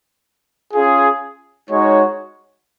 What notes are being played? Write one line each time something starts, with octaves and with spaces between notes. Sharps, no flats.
C#4 F4 G#4
G#3 D#4 F#4 C#5